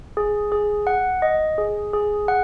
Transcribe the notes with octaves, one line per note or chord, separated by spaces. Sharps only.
G#4
G#4
F#5
D#5
G#4
G#4
F#5